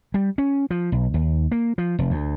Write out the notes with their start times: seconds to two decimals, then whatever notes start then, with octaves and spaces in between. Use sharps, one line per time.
0.14 G3
0.38 C#4
0.70 F3
0.92 B1
1.14 D#2
1.52 A#3
1.78 F3
1.99 F1
2.11 D2